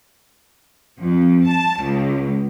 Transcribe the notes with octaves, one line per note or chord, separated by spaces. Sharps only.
F2
A5
C#2